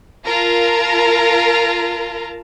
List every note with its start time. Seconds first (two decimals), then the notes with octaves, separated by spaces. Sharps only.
0.25 F4 A#4 A5 A#5